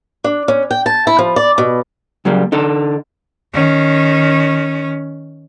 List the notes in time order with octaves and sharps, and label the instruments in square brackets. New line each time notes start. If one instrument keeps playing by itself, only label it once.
[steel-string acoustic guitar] D4
C#4
G5
A5
E4
F3
D5
B2
[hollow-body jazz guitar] C#3 F#3 G3 A#3
D3 D#4 A4
[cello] D#3 C#4